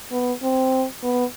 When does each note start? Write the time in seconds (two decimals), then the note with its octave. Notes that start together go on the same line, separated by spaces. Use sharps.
0.11 B3
0.43 C4
1.03 B3